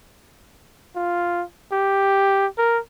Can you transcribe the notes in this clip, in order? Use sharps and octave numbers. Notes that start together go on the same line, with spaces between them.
F4
G4
A#4